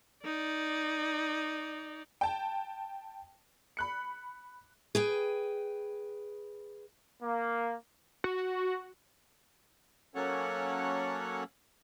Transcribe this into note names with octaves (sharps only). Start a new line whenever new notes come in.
D#4 D5
G5 A5
B5 F#6 C#7
G#4 B4 G5
A#3
F#4
F#3 A#3 C#4 A4 C#5 F#5